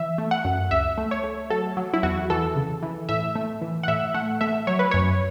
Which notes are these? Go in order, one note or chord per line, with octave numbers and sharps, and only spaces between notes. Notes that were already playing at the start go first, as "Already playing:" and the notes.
Already playing: E3 E5
A3
F#5
F#2
C#2 E5
A3
C#5
A3
F#3 A4
F#3
E4
E2 F#4
E3 A4
C#3
E3
A2 E5
A3
E3
F#5
A2 E5
A3 F#5
A3 E5
F#3 C#5
B4
F#2 C#5